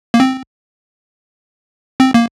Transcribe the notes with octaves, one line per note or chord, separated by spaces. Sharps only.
A#3
C4
C4
A#3